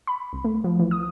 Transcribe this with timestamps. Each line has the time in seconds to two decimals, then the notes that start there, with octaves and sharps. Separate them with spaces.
0.07 B5
0.33 C2
0.44 A3
0.64 F3
0.79 E3
0.91 D#6